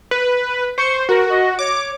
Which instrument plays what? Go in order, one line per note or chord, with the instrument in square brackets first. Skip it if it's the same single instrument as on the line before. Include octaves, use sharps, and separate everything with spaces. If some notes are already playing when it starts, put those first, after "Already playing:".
[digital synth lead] B4
[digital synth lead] C5 [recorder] C#6
[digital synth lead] F#4 [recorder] A#4
[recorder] D#5
[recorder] C#5 [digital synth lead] D6